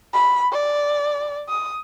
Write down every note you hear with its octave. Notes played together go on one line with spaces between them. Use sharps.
B5
D5
D#6